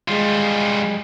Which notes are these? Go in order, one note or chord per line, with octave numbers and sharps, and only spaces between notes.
G3 G#3 F4